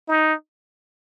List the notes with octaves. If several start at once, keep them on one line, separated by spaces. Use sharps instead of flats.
D#4